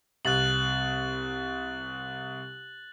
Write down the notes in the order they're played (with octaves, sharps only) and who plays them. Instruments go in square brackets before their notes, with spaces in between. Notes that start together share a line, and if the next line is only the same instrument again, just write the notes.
[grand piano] C2 [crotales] F#6 A6 F#7